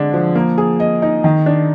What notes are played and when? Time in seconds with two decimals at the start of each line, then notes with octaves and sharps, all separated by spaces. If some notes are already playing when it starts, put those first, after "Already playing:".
Already playing: D3 G#3 D4
0.13 F3
0.35 A#3
0.58 G#4
0.80 D#5
1.02 D#4
1.24 D#3
1.46 D4